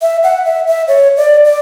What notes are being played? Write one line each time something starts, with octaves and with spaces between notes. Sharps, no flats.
E5
F#5
E5
E5
C#5
D5
D5